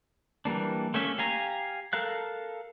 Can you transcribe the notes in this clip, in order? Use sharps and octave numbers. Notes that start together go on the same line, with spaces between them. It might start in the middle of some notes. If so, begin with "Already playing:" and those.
E3 G3 A#3 D4
A3 A#3 C#4 E5
G4 F5 G#5 A#5
A4 A#4 F5 F#6